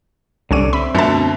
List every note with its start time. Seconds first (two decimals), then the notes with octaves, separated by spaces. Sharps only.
0.51 C2 D3 C#4 D5 D#7
0.73 C4 E5 B5
0.94 F#2 B2 D3 A3 A5